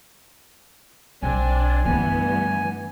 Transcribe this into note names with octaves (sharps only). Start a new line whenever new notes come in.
B1 C4 D4 G#5
G2 D3 E3 A3 B3 G#5